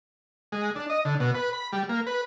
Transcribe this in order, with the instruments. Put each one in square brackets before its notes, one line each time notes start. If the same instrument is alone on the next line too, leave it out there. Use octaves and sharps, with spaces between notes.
[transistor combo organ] G#3
D4
D#5
D3
B2
B4
B5
G3
A#3
B4